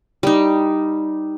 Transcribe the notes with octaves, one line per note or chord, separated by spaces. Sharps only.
G3 D#4